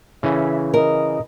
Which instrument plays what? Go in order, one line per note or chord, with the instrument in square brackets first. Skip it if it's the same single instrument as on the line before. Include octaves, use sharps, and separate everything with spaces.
[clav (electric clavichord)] C#3 E3 C#4 [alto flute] E5
[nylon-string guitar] A#4 [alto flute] D#5